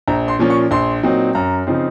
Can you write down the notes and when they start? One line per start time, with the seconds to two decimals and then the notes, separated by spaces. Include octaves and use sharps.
0.08 A#1 A#5
0.28 C6
0.39 A#2 F3 A#3 C#4
0.50 C#6
0.71 A#1 C6
1.03 A#2 F#3 C4 D#4
1.35 F#2 A#5
1.67 C#3 F3 C4 D#4